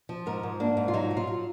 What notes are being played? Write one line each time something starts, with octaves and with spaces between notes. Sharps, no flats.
F3
G#2 A#4
G#2
A#3 D4
G#2
F4
F#3 D#4
F#3
F4
F#3